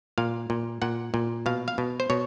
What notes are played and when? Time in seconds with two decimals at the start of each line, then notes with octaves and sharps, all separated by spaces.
0.18 A#2 F5
0.50 A#2
0.82 A#2 F#5
1.14 A#2
1.46 B2 F5
1.68 F5
1.78 B2
2.00 C5
2.10 B2 C#5